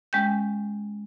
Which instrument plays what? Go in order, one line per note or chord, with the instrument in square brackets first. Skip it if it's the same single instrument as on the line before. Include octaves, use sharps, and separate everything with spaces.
[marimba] G#3 C#4 G5 G6